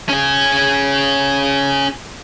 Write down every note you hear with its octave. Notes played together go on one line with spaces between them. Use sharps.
C#4 G#4